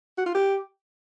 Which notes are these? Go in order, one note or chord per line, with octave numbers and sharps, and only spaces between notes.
F#4
F4
G4